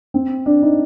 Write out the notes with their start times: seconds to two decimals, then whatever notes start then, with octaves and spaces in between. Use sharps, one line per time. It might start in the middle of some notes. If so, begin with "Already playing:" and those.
0.14 C4
0.46 D4
0.63 D#4